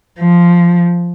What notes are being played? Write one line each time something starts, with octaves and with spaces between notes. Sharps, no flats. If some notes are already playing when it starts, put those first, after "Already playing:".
F3